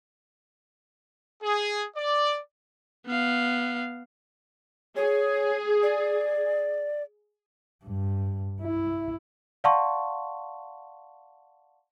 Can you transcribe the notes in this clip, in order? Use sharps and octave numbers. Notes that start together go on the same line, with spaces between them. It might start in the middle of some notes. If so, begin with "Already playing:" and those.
G#4
D5
B3 F5
G#4 C#5
D5
G2
E4
D5 F5 F#5 A5 C6 C#6